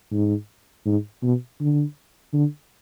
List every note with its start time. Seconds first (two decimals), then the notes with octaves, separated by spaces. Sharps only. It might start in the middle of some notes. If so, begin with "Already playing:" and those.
0.12 G#2
0.85 G#2
1.22 B2
1.60 D3
2.33 D3